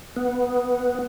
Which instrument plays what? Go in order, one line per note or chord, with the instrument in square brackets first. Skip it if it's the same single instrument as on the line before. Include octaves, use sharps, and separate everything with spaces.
[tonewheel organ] B3